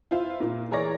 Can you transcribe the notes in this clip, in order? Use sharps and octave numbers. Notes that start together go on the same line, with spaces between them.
E4 F4 C5 F5
A#2 A#3
E3 G#4 A#4 C#5 D5 A#6